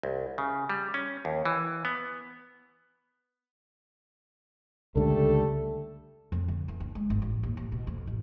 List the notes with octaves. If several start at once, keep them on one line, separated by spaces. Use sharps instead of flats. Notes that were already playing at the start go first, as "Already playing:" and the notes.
C2
C#3
G3
C#4
D#2
E3
B3
C#2 D3 G3 A3 A4
F2
D3
E3
D4
G#3
G1
A1
D#2
A1
B2
F2
A1